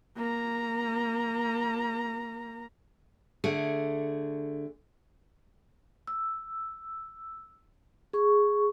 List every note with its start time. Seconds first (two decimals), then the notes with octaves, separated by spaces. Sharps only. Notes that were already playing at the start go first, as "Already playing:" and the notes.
0.17 A#3 A#5
3.44 D3 A3 G#4
6.07 E6
8.13 G#4 C#6